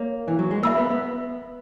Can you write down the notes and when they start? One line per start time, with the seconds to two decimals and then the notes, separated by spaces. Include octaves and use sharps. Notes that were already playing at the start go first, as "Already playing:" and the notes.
Already playing: A#3 C#5
0.28 E3
0.39 F#3
0.51 G#3
0.63 A#3 E5 B5 E6
0.77 B3
0.90 B3